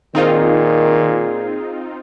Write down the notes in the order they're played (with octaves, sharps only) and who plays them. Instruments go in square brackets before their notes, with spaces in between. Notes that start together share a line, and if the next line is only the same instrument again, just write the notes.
[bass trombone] A#2 [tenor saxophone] D#3 [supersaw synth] C4 D#4 F4 [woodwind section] G#4